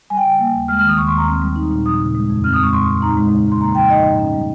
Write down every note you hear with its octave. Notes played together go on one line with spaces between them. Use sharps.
G3 G#5
G5
C#3 G#5
A#3
D#2
G#3 F6
F6
D#3 D#6
D#2 C#6
C6
D#2
A#5
C4
G3
D#4
A#2
F3 D#6
C#3
G#3
F2
C4 F6
D#6
G#3 C#6
A#2 C6
A#2
D#4 A#5
G#3
C#3
C#3
C6
A#3 A#5
F3 G5
D#4 D#5
G#2
C#4
G3